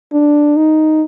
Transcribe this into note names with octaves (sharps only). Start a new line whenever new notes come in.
D4
D#4